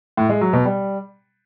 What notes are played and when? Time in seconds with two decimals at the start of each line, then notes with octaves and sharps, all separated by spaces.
0.17 A2
0.29 G#3
0.41 F#3
0.53 B2
0.65 G3